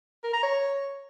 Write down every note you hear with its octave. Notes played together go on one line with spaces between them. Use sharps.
A#4
A#5
C#5